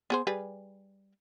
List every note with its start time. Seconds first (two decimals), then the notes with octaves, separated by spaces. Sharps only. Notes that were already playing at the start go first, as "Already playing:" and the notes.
0.10 B3 G#4 C5
0.27 G3 G#4 B4